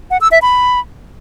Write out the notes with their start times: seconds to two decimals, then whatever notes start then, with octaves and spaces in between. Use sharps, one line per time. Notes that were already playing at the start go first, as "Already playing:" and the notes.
0.11 F#5
0.21 E6
0.32 E5
0.42 B5